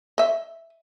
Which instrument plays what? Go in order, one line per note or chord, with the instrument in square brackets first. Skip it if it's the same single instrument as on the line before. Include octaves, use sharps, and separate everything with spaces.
[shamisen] D#5 E5